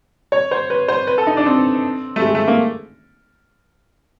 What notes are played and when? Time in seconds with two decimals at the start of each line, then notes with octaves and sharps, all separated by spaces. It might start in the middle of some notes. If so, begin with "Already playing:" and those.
0.32 C#5
0.51 C5
0.70 B4
0.88 C5
1.07 B4
1.18 A4
1.27 D#4
1.37 D4
1.46 C4
2.16 A3
2.22 G#3
2.35 A3
2.47 A#3